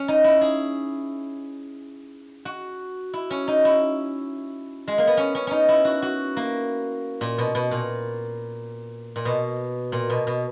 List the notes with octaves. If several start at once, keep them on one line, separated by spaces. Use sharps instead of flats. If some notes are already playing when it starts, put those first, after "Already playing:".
Already playing: C#4
D#4
E4
G#4
F#4
E4
C#4
D#4
E4
G#3
A#3
B3
C#4
C#4
C#4 D#4
E4
F#4
F#4
A#3
A#2
B2
B2
A#2
A#2
B2
A#2
B2
B2